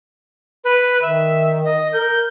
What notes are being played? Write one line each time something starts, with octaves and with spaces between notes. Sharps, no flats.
B4
D#3 E5
D#5
A#4 G6